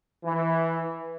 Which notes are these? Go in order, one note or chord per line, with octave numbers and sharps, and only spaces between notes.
E3